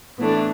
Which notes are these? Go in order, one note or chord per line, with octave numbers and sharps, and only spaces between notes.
A2 E3 A3 B3 D4